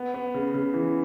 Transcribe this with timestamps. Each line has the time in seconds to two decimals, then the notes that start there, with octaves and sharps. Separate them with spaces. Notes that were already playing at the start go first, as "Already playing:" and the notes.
Already playing: B3
0.14 B3
0.34 C#3
0.54 C#3
0.74 E3